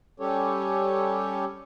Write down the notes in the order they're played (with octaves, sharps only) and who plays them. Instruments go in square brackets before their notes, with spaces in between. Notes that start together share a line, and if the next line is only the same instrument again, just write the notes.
[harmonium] G3 C#4 G4 A4 C#5